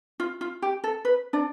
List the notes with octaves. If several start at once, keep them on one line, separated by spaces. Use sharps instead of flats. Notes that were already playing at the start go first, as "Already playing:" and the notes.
F4
F4
G4
A4
B4
D4 D5